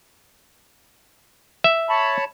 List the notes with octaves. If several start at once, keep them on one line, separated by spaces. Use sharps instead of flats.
E5
C#5 A5 B5